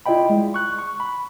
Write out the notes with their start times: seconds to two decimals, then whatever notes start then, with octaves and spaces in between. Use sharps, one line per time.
0.06 E4 F4 D5 D#5 G5 B5
0.30 G#3
0.54 C#6 F#6
0.79 C#6
1.00 B5